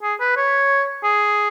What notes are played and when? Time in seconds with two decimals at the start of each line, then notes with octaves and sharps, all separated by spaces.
0.02 G#4
0.20 B4
0.37 C#5
1.03 G#4